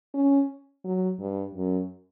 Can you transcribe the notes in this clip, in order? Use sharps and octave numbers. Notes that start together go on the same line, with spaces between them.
C#4
F#3
G2
F#2